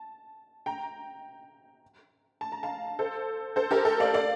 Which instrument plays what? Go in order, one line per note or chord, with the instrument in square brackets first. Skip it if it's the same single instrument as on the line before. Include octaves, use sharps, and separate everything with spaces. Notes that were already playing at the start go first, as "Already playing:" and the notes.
Already playing: [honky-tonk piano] A5
G5 A#5
A5
A#5
F5 A5
A4 C5
A4 C5
G4 A#4
A4
D5 F5
D5 F5